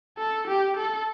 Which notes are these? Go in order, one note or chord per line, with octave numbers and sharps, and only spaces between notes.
A4
G4
A4